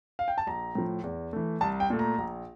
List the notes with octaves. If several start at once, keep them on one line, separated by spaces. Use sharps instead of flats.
F5
G5
A5
A#1 A#5
A2 F3
E2
E3 A3
C2 A5
G5
A#2 A3
A#5
A#1